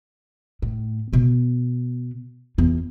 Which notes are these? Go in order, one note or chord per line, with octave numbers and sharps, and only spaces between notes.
A2
B2 B3
E2 F4